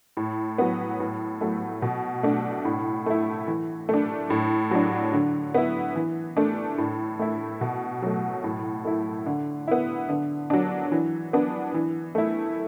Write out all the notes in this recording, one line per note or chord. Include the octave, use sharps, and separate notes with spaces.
A2
F#3 B3
A2
F#3 A3
B2
A3 D4
A2
A3 E4
E3
A3 D4
A2
F#3 D4
D3
B3 E4
E3
A3 D4
A2
A3 E4
B2
F#3 A3
A2
A3 E4
D3
B3 E4
D3
F#3 D4
E3
B3 D4
E3
A3 E4